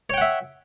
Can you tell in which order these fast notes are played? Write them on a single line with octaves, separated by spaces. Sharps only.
C#5 G5 F#5 E5